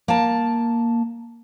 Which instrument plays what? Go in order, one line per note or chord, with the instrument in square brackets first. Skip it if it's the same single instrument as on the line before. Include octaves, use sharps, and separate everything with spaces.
[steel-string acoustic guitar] A#3 A5